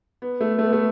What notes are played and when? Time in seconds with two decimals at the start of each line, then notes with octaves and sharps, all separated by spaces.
0.22 B3
0.41 A3
0.59 A3
0.66 B3
0.73 A3